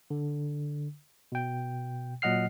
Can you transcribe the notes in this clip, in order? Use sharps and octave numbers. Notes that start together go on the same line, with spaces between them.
D3
B2 G5
A#2 F#3 D#5 F#5 F6 C7